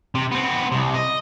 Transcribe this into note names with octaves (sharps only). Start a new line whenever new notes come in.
C3
B3 C4
C2 C3
D#5